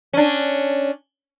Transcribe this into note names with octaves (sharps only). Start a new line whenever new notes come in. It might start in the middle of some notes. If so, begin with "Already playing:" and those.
C#4 D4